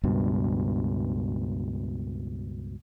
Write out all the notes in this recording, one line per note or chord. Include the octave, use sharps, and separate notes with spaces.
C#2 G2 B2